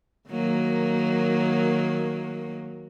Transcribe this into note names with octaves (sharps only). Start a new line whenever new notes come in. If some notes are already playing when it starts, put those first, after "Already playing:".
D#3 F#3 A#3